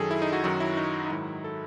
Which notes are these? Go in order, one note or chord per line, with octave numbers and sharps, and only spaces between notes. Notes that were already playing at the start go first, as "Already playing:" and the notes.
Already playing: F#2 D#3 F#3 G#4 A4
E4
D#4
F#4
F#2 D#3 F#3 F#4
E4
D#4
D#4
G#2 D#3 F#3 E4
A4